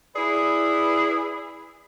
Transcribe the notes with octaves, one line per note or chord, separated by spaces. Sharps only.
E4 G#4 B4 D5